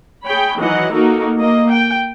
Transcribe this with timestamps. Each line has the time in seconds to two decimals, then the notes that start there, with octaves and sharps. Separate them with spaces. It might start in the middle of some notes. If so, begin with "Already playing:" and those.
0.25 G#4 C#5 G5 B5
0.58 D#3 E3 F#3 D#5 F#5
0.92 A#3 D#4 F#4 A4 A#4
1.37 A#3 D#5
1.72 G5